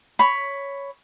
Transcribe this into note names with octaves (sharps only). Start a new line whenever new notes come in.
C#5 B5